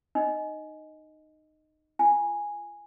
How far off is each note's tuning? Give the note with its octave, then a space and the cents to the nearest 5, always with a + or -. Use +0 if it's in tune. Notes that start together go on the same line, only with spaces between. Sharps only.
D#4 -20 D#5 +5
F4 -35 G#5 -5